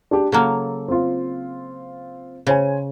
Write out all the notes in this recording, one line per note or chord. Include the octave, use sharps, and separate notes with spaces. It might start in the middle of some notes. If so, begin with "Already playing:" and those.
D4 G4
C#3 F#3 A#3 A4
C4 F4
C#3 C5 C#5 G#5